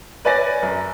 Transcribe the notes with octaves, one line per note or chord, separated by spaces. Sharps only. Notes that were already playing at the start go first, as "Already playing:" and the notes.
B4 C#5 D5 G#5 A6 A#6
F#2